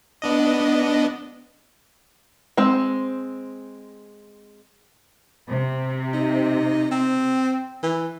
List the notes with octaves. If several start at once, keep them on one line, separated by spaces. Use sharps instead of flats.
B3 D4 D#5
G#3 C4
C3
D#4
C4
E3